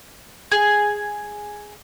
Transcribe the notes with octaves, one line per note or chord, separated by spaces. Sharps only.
G#4